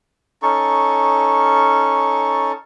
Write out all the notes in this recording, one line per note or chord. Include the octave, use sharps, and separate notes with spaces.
C#4 D#4 A4 C#6